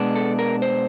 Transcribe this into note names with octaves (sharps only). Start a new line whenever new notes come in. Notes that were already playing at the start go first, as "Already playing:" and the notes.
Already playing: B2 G#3 B3 D4
A4
A#4
C5